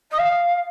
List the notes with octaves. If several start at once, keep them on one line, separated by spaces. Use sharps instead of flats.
D#5
F5